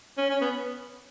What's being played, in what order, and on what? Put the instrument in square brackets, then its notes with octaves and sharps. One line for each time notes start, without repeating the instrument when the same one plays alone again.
[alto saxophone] C#4
C#4
B3